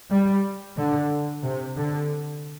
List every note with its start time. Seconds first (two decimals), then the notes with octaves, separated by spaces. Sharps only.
0.10 G3
0.77 D3
1.43 C3
1.76 D3